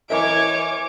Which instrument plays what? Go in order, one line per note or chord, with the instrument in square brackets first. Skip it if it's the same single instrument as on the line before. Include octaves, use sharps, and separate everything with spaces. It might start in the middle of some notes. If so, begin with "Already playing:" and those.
[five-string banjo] E3 E5 [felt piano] E4 A#4 D#5 [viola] C#5 G#5 [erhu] D6